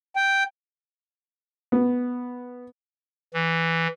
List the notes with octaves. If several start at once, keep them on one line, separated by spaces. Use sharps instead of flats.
G5
B3
E3